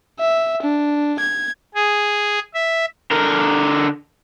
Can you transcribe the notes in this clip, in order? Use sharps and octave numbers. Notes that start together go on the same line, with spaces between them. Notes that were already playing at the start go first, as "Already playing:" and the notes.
E5
D4
G#6
G#4
E5
D3 A#4